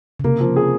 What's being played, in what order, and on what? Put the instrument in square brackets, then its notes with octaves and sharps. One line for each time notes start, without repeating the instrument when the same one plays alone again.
[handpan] C#3
[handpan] C3 [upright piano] A#3
[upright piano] F3
G#4